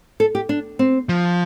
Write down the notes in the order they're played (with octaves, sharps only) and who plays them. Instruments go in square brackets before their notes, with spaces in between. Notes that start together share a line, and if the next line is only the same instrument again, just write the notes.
[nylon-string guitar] A4
G4
D4
C4
[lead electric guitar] F3